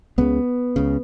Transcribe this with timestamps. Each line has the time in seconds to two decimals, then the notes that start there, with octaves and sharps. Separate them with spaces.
0.18 C#2 C#3 B3
0.76 C#2 C#3